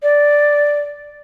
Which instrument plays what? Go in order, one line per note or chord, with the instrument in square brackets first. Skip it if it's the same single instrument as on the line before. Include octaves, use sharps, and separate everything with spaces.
[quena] D5